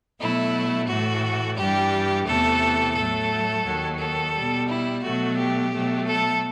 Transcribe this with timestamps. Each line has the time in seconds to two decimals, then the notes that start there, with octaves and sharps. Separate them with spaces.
0.19 B2 F#3 A3 E4
0.87 A2 E3 A3 F#4
1.57 G2 E3 G3 G4
2.27 E2 C3 E3 A3 A4
2.95 A2 F#3 A3 A4
3.64 D#2 D#3 F#3
3.99 A4
4.33 G3
4.39 B2
4.68 E4
5.04 B2 F#3 A3 F#4
5.38 G4
5.73 B2 F#3 A3
6.07 A4